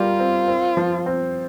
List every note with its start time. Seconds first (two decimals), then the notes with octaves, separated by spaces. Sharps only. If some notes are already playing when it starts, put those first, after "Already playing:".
Already playing: G3 F4 A#4
0.19 C4
0.48 C4
0.77 F3
1.06 C4